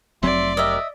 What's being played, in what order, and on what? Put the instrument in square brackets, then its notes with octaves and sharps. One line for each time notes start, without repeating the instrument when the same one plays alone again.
[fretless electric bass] F1 F#3 C4 [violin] D5 [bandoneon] E5 C6
[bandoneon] G4 A#4 [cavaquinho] D#5 E5